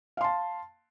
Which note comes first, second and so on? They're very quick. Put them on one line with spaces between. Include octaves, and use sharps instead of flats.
F5 C6 A5